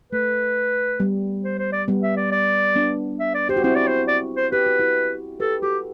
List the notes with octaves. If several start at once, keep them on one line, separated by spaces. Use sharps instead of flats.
A3 B4
G3 B3
C5
C5
D5
G3 B3
E5
D5
D5
B3 D4
E5
D5
G4 C5
F#4
C4 E4 C5
D5
C5
D5
C5
G4 B4
F#4
E4 G4
G4 A4 B4
F#4 G4 A4